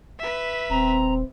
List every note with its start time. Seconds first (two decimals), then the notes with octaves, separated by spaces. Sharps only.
0.19 B4 E5
0.70 D#1 C4 A#5